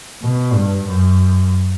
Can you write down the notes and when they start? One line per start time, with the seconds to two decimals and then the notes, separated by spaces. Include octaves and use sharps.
0.22 B2
0.54 G2
0.86 F#2